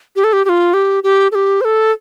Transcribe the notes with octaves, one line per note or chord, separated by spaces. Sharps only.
G4
A4
G4
G4
F4
G4
G4
A4
G4
C5
A4